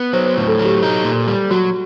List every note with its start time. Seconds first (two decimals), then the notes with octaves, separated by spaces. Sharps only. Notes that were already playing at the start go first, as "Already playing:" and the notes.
Already playing: B3
0.13 F#3 C5
0.37 A2
0.48 A4
0.59 F#3
0.65 G4
0.83 D#4
1.05 A#2
1.28 G3
1.51 F#3 F#4